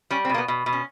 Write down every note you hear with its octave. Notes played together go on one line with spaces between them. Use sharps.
G3 C#4
C4
B2 A#3
B3
B2
B2
C#4